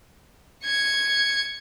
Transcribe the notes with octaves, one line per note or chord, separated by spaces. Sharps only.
G#6 C#7